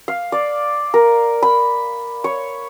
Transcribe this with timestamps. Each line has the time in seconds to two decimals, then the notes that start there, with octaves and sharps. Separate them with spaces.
0.08 F5
0.32 D5
0.94 A#4
1.43 B5
2.24 C#5